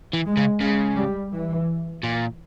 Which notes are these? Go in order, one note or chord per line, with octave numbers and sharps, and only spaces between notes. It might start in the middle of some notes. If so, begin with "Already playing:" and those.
E3
G#3
C#3
C#3 G#3
G3
E3
A#2